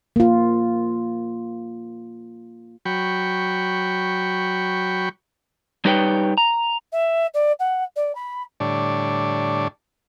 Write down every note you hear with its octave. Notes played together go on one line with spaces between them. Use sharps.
A#3 F4
F#3 G5 B5 C#6
G3 D#4 G4 B4 C#5 G5
A#5
E5
D5
F#5
D5
B5
A2 D3 G3 D4 C#5 D5